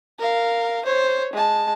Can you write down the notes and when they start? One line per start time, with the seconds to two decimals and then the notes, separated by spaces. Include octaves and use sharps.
0.19 A#4 F5
0.85 C5 C#5
1.33 G#3 A5